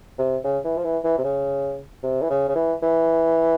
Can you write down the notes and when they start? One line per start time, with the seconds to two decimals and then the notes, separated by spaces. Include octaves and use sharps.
0.18 C3
0.44 C#3
0.64 E3
0.77 F3
0.84 E3
1.04 E3
1.18 C3
1.24 C#3
2.03 C3
2.22 E3
2.30 C#3
2.48 C#3
2.55 E3
2.82 E3